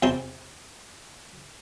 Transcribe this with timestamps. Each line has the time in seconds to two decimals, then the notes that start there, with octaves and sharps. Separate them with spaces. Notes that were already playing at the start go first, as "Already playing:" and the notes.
0.03 E2 C3 G5 A5 A#5 C6